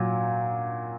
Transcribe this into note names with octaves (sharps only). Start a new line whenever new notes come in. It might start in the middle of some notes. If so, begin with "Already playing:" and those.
Already playing: A#2 F#3